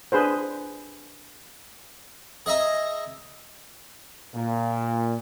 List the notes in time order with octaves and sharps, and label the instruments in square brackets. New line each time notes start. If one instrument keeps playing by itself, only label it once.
[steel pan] D4 G#4 B4 C5
[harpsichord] G#4 D#5 E5 A#5
[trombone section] A#2